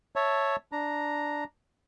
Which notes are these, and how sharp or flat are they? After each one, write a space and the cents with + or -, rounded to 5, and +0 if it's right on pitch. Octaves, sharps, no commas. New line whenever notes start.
C#5 +0 E5 +0 A5 +0
D4 +0 A#5 +0